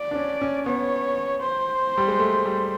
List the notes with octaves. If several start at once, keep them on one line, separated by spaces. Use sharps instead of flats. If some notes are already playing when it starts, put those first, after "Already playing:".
Already playing: D5
D4
C#4
C#4
B3 C#5
C5
G3
G#3
A3
G3